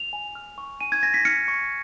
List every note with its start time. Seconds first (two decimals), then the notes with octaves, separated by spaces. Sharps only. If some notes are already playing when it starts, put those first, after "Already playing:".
Already playing: F7
0.13 G#5
0.35 F6
0.58 C#6
0.81 G#5 D#7
0.92 G#6
1.03 G#5 A#6
1.14 B6
1.25 F6 C#7
1.48 C#6